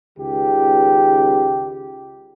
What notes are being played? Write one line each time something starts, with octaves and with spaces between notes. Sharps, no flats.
C#2 D#3 G4